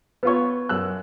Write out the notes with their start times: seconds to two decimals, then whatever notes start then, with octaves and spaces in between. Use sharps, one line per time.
0.23 B3 F4 B4 C#5 C#6
0.69 F#2 E6 F#6